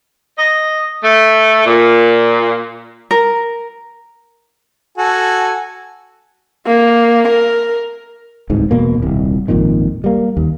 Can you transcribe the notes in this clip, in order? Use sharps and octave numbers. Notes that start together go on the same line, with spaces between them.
D#5
A3
A#2
A#4
F#4 A4 G#5
A#3
A#4
D1 C2 G#2 B2
E1 B2 A#3
D#1 C2
G#1 F2 A#2 D#3
G3 A#3
D#2